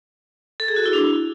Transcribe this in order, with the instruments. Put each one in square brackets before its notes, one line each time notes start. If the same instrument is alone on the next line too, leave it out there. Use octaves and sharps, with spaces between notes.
[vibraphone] A4
G#4
F#4
E4
D4